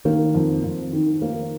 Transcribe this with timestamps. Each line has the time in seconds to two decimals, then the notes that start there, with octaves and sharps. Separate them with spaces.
0.05 D#3 A#3
0.34 F2
0.64 F2
0.93 D#3
1.22 A#3